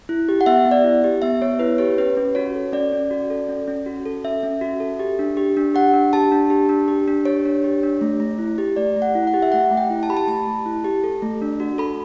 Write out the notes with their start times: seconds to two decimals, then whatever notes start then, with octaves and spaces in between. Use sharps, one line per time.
0.09 E4
0.29 G4
0.41 F#5
0.46 B3 E5
0.65 B3
0.71 D5
0.84 E4
1.04 G4
1.22 B3 E5
1.42 B3 C#5
1.59 E4 B4
1.78 G4 C#5
1.98 C#4 B4
2.17 C#4
2.35 F#4 C#5
2.55 A4
2.73 C#4 D5
2.93 C#4
3.11 F#4
3.30 A4
3.49 C#4
3.68 C#4
3.86 F#4
4.05 A4
4.24 C#4 E5
4.43 C#4
4.61 F#4
4.80 A4
4.99 G4
5.19 D4
5.37 G4
5.57 D4
5.74 G4 F#5
5.94 D4
6.13 G4 A5
6.32 D4
6.50 G4
6.69 D4
6.88 G4
7.08 D4
7.25 G4 C#5
7.45 D4
7.64 G4
7.83 D4
8.01 A3
8.20 A3
8.39 E4
8.58 G4
8.76 A3 D5
8.96 A3
9.02 F#5
9.15 E4
9.27 F#5
9.34 G4
9.42 E5
9.52 A3 F#5
9.71 A3
9.77 G5
9.90 E4
10.03 A5
10.09 G4 B5
10.17 A5
10.27 A3 A5
10.47 A3
10.66 E4
10.84 G4
11.04 A4
11.22 A3
11.42 D4
11.60 F#4
11.78 A4 B5